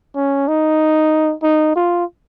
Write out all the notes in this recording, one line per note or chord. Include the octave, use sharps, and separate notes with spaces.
C#4
D#4
D#4
F4